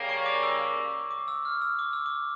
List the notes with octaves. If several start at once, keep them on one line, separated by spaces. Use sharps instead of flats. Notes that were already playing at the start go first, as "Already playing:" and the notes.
Already playing: C#3 G3 A#3
C#6
D6
E6
D6
E6
F6
E6
D6
E6
D6